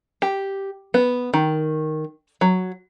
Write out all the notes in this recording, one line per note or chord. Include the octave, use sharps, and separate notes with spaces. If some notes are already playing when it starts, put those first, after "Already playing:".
G4
B3
D#3
F#3